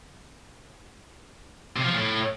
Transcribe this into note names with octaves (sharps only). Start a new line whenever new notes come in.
C3
F3
A2